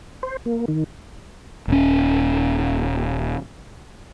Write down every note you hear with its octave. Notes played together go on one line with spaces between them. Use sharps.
C5
A#3
D#3
D#1 C#4